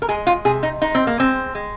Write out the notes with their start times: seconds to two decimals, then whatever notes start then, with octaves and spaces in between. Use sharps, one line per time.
0.02 A#4
0.09 G#3 G#4
0.27 F4
0.45 C3 G#4
0.63 D#4
0.82 G#3 D#4
0.95 C4
1.07 A#3
1.18 G#3 C4
1.55 G#3